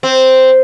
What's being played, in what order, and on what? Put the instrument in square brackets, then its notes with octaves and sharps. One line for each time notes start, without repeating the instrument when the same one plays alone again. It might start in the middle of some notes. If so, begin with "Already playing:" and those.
[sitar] C4